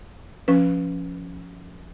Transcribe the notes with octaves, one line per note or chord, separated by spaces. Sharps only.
F3 C#4 B4